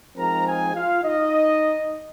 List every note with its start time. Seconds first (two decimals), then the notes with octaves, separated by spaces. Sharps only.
0.17 F3 G#3 C4 D#4 A#4 A#5
0.46 G#4 G#5
0.75 F4 F5
1.03 D#4 D#5